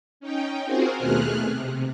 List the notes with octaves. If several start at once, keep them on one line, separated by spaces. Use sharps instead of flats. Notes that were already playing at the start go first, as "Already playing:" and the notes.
C#4 D#4 G5
C4 F4 F#4 G#4 A#4 C5
D#2 B2 A3 G#4 F6 F#6
C3